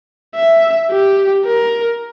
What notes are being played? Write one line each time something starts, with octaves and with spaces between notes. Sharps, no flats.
E5
G4
A#4